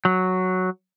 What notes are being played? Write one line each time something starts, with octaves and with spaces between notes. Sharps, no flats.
F#3